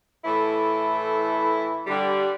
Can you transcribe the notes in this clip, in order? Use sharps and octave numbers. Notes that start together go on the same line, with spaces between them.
A2 E3 E4 A4
D3 G3